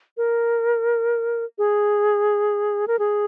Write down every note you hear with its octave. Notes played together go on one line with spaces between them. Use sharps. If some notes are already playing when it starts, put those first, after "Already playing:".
A#4
G#4
A#4
G#4